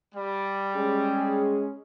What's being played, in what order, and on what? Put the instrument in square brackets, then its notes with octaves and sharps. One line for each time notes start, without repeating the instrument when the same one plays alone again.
[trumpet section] G3
[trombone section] G#3 C#4 G#4